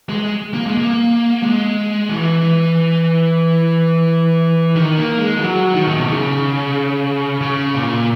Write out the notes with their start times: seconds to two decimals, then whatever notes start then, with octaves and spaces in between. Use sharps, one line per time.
0.09 G#3
0.54 A#3
0.66 G#3
0.77 A#3
1.43 G#3
2.09 E3
4.76 D#3
4.98 A#3
5.19 G#3
5.37 E3
5.41 F#3
5.75 D#3
5.86 A#2
5.97 B2
6.08 C#3
7.41 C#3
7.75 A#2